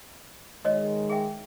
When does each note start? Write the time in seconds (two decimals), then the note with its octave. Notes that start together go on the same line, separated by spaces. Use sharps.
0.65 D#3 G#3 F#4 C#5 D#5
1.10 G#4 E5 G5